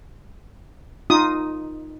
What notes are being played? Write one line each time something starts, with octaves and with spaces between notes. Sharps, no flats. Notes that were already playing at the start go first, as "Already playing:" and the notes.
D#4 F4 D#6